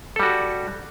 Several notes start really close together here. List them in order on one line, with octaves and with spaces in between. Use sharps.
A4 G3 F#4